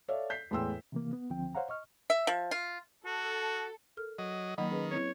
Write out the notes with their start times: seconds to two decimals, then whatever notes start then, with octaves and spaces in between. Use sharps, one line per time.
0.08 A4 C#5 D5 E5 F5
0.30 G6 B6 C7
0.51 E2 A2 G#3 G5 C6 E6
0.92 C3 E3 A#3
1.13 B3
1.30 C#2 D3 F3 C4 G5
1.55 C5 C#5 F5 F#5 A#5
1.69 D#5 C#6 F6
2.10 E5
2.27 F3
2.51 F4
3.05 F#4 A4
3.97 A4 A#4 F6
4.18 F#3 D#5
4.58 D#3 F#3 A#3 F#5 B5
4.70 C#4 G#4 B4
4.91 C4 E4 C#5